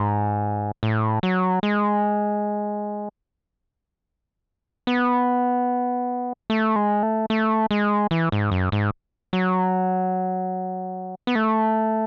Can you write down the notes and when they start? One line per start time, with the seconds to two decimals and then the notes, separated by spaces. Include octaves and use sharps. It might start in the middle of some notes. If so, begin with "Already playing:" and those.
Already playing: G#2
0.83 A2
1.23 F#3
1.63 G#3
4.87 B3
6.50 A3
6.76 G#3
7.03 A3
7.30 A3
7.71 G#3
8.11 E3
8.32 G#2
8.51 F#2
8.72 G#2
9.33 F#3
11.27 B3
11.35 A3